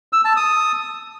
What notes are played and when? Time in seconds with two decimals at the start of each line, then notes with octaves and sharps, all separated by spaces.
0.13 E6
0.25 A5
0.37 D#6